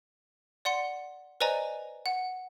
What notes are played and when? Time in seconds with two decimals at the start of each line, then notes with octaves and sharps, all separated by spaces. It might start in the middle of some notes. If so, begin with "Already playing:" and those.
0.65 D5 F#5 C6 C#7
1.41 B4 C5 D5 D#5 G#5 A#5
2.06 F#5